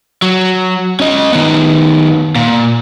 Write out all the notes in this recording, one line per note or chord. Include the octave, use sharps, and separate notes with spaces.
F#3
C#4 D#5
D#3 B3
A#2